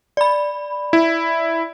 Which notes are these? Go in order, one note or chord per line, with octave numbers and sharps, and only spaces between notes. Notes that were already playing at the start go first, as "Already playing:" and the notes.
D5 B5
E4